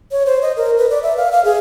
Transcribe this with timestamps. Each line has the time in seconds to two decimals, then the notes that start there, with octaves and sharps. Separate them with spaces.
0.12 C#5
0.26 C5
0.42 D#5
0.57 A#4
0.78 B4
0.90 D5
1.03 E5
1.17 F5
1.32 F5
1.45 G#4